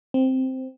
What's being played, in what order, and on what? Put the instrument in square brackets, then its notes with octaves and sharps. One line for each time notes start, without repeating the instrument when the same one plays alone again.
[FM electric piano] C4